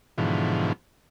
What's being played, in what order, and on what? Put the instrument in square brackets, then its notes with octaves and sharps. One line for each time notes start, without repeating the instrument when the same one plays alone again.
[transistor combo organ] G#2 B2 D3 E3 F3